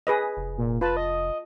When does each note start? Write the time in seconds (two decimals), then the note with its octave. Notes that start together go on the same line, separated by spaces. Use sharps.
0.07 G#4 B4 D#5
0.37 F1
0.58 A#2
0.81 F4 B4 A5
0.97 D#5